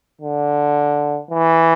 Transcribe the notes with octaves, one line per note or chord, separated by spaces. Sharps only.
D3
E3